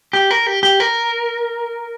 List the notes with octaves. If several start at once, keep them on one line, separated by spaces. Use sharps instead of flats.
G4
A#4
G4
G4
A#4